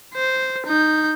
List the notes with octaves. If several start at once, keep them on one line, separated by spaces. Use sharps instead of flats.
C5
D#4 G6